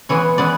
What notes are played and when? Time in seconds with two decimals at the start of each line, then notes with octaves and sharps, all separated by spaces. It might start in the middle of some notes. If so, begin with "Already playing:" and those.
0.09 E3 G#3 B3 C#5
0.38 E3 G#3 B3 D5